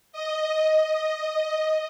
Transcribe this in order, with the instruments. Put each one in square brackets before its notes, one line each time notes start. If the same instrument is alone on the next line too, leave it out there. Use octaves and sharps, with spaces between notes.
[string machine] D#5
D#5